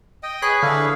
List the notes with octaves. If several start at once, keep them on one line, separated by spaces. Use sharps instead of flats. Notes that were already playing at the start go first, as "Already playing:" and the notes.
D#5 G5
G#4 B4 C#5 F#6
D3 D4 E4 G#4 F5